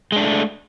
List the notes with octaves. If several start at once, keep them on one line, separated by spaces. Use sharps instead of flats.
G#3 A3 D4